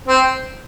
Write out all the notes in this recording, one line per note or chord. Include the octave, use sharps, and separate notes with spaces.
C4